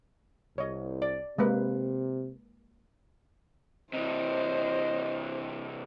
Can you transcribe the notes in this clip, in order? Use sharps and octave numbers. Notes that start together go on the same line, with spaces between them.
C2 C#5 D#5
D5
C3 G#3 A#3 B4
C3 E3 C5 D#5